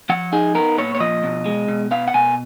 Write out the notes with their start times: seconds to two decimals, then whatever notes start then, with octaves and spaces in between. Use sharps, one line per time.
0.09 F3 F#5
0.32 D#4 G#4
0.55 B3 A#4
0.78 A#2 C#5
0.95 C#5
1.00 F3 D#5
1.24 B2
1.45 G#3
1.68 B2
1.91 B3 F5
2.08 F#5
2.14 B2 G#5